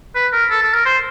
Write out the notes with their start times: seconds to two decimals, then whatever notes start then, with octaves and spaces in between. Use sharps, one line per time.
0.15 B4
0.33 A#4
0.50 A4
0.62 A4
0.73 A#4
0.85 C5